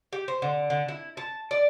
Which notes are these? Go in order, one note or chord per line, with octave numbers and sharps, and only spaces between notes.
G4
C5
D3
D3
E4
A5
D5